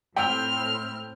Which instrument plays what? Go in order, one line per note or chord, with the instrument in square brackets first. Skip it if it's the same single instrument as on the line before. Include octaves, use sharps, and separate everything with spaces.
[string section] A2 C4 [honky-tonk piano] G5 [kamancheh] F6